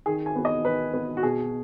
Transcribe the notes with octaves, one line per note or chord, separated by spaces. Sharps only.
D#3 G#4
G#5
B3
D#5
D#3 B4
B3
F#4
B2 G#4